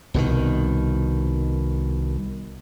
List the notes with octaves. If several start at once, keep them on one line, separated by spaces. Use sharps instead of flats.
C2 B2 D3 D#3